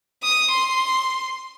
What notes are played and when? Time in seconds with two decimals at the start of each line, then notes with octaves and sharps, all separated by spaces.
0.23 D#6
0.52 C6